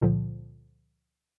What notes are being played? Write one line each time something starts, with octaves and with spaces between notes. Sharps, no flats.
C#2 A#2 D3 F3